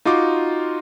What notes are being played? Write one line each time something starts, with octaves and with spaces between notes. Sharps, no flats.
D#4 F4 F#4 C6 D6